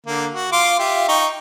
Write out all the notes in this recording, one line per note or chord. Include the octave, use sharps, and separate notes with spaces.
D3 A#3
F#4
F4 C6 D6
F4 G4 E5
D#4 G5 C#6